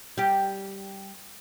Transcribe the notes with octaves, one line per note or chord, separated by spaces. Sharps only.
G3 G4